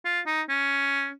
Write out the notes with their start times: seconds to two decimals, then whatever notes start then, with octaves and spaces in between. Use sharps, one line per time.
0.05 F4
0.27 D#4
0.49 C#4